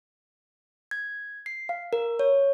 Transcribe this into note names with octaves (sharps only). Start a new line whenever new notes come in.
G#6
C7
F5
A#4
C#5